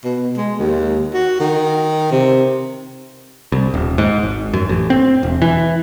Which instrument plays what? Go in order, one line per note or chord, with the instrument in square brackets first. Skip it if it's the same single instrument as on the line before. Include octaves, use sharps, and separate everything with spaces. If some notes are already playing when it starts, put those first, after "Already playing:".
[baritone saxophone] B2
G#3
D#2
F#4
D#3
C3
[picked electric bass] C2
D#1
G#2
G#1
F#2
A1
C4
E1
E3